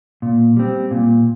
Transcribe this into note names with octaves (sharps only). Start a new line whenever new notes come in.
A#2
G3 C4
A#2